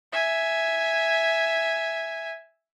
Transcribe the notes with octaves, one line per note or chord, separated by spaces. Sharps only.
E5 G#5